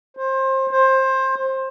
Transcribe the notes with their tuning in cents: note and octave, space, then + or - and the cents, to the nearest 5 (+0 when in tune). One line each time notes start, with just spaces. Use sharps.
C5 +25
C5 +20